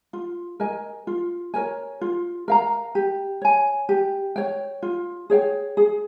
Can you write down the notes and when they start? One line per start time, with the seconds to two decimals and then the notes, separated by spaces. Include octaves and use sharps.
0.13 F4
0.60 A#4 D#5 G#5
1.07 F4
1.54 A#4 C#5 G#5
2.01 F4
2.48 A#4 F5 A#5
2.95 G4
3.42 C#5 G#5
3.89 G4
4.36 C#5 G5
4.82 F4
5.30 G#4 C#5 G5
5.77 G#4